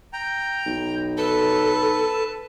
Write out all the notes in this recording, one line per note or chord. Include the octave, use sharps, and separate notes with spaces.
G5 A#5
B1
A4 B4 A5